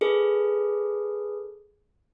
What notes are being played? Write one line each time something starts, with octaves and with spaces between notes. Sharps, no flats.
G#4 A4 B4